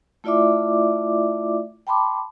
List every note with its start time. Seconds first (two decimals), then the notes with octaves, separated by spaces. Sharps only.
0.24 A3 E4 F4 D5 E5 D6
1.87 G5 A5 B5 C6 D6